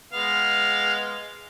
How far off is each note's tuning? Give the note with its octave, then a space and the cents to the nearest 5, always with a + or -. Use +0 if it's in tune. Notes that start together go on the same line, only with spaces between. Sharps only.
G#3 +0 B3 +0 F5 +0